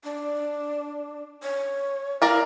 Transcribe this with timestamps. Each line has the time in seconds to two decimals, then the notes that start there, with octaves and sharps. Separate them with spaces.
0.04 D4
1.43 C#5
2.22 E4 A#4 D5 F5